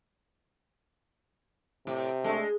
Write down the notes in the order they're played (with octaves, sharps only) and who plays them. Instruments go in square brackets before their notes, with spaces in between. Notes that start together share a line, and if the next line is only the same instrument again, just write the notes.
[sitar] A2 [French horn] C3
[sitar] G#3 [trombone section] A3 D4